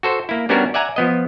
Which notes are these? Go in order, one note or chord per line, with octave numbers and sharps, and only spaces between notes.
F#4 A4 C5
A#3 E4
G3 B3 C#4 D4 F#4 A#4
D5 E5 F#5 G#5 A#5
F3 B3 D#5